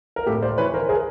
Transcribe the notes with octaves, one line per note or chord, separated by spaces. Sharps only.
A#4
A2 G4 A4
C5 D5
E3 B4 C#5
A#4 C5
G#4 A#4